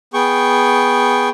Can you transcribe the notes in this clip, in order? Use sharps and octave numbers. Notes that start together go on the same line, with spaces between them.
B3 G#4 G5 C#6